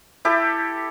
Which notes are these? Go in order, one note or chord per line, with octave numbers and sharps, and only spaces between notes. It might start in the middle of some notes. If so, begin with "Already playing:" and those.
E4 G4 A4